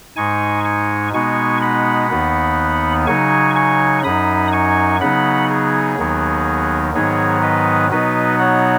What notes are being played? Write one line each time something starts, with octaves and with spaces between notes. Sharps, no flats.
G#2 G#3 D#4 G#5 C#6
G#5 C#6
B2 G#3 B3 D#4 G#5 C#6
F#5 B5
D#2 D#3 B3 D#4
C#3 F#3 D#4 G#5 C#6
G#5 C#6
F#2 F#3 D#4 B5 D#6
G#5 C#6
C#3 F#3 B3 D#4 F#5 B5
G#4
D#2 D#3 F#3 B3 D#4
G#2 D#3 F#3 B3 D#4 G#4 C#5
B4 D#5
B2 F#3 B3 D#4 B4 D#5
C#5 F#5